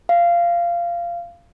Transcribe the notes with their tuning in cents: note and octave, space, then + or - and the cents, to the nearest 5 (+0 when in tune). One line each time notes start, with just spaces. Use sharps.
F5 -15